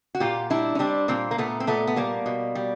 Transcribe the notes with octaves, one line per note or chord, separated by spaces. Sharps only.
F#4
A#2 F4 G4
G3 D4 E4
C#4
G3 C4 D4
A#2 A#3 C4
A#3
A#2 A3 B3
C4
A#2 A3 B3
B3
G3 A#3
B2
G3